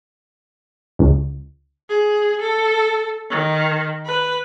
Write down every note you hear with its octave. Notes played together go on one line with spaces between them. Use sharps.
C#2
G#4
A4
D#3
B4